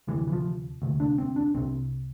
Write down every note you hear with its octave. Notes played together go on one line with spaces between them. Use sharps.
D2 C3 E3
E3
F3
D2 C3
D4
C4
D4
C2 C3 C4